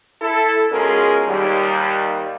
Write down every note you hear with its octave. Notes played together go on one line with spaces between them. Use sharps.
E4 A4
B2 G#3 C#4 F4 G#4 A#4
D#2 G3